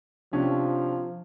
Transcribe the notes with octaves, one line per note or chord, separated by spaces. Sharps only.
C3 F3 C#4 D4